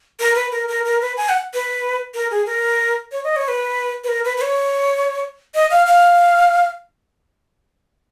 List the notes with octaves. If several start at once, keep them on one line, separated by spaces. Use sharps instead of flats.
A#4
B4
A#4
A#4
A#4
B4
G#5
F#5
B4
A#4
G#4
A#4
C#5
D#5
C#5
B4
B4
A#4
B4
B4
C#5
D#5
F5
F5